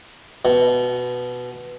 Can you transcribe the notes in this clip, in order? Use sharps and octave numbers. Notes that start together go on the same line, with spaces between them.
B2